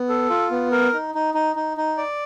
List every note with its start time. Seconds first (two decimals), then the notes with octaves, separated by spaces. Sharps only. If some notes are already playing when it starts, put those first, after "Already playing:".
Already playing: B3
0.09 A4
0.30 F4
0.51 B3
0.72 A#4
0.93 D#4
1.15 D#4
1.34 D#4
1.56 D#4
1.77 D#4
1.97 D5